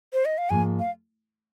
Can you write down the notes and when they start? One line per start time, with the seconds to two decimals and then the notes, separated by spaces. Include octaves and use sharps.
0.13 C5
0.25 D#5
0.38 F5
0.50 G#2 F3 A#3 G#5
0.79 F5